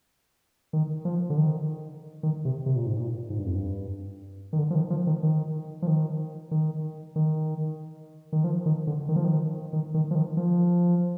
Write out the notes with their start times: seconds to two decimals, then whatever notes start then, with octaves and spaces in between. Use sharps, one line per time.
0.73 D#3
1.05 F3
1.30 D3
1.37 D#3
2.23 D#3
2.45 C3
2.66 C3
2.76 A#2
2.86 G#2
2.96 A#2
3.30 G#2
3.38 G2
3.46 F2
3.55 G2
4.53 D#3
4.59 D3
4.70 F3
4.75 D#3
4.90 F3
5.07 D#3
5.23 D#3
5.82 F3
5.87 D#3
6.51 D#3
7.16 D#3
8.32 D#3
8.44 F3
8.66 D#3
8.87 D3
9.09 D#3
9.16 F3
9.24 D#3
9.73 D#3
9.94 D#3
10.11 F3
10.15 D#3
10.37 F3